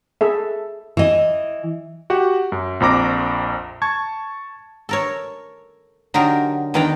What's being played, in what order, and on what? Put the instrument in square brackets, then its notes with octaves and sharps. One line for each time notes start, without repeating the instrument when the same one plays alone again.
[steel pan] G#4 A4 E5
[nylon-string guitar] E3 D#5
[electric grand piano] F#4 G4 F#5
F#2
A#1 F2 A#5 D6 A#6
A5 C#6 G#6
[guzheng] A4 A#4 C#5
D3 F#3 D#4 G4 A#4
E2 D#3 D4 F5 G5 A#5